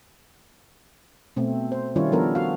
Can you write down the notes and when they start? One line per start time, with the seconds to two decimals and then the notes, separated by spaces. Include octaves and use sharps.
1.36 B2 A3 C4
1.72 C5
1.96 D#3 G3 C#4 E4 F4 C#5
2.12 F3 G3 B3 D4 A4 A#4
2.35 F#4 F5